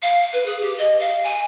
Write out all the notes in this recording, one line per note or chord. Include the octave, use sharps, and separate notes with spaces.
F5
B4
G#4
G4
D#5
F5
G#5